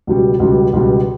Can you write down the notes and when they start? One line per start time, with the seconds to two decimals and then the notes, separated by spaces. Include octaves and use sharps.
0.07 C#2 B2 G3
0.40 C#2 B2 G3
0.73 C#2 B2 G3